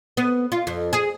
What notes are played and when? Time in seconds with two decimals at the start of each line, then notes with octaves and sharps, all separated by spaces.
0.17 B3
0.52 F4
0.67 F2
0.93 G#4